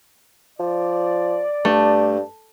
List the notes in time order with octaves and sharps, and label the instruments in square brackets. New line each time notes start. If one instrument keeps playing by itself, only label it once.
[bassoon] F3 [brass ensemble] D5
[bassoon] G2 [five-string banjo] A3